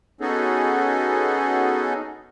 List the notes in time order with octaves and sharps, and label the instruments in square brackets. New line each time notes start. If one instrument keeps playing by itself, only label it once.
[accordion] B3 C#4 D#4 F#4 G#4 A4